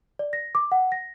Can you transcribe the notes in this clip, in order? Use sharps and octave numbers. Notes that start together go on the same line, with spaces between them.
D5
A#6
D6
F#5
A#6